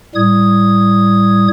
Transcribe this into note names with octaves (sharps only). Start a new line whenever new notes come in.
A2 G3 D#6 G#6